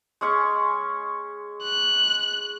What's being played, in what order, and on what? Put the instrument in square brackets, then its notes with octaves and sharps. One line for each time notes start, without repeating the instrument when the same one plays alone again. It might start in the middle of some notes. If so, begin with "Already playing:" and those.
[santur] G#3 C#4 C#6
[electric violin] F#6